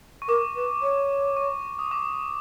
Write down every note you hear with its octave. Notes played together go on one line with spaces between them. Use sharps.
C#6
A#4 D6
B4
C#5
C#6
D#6
D6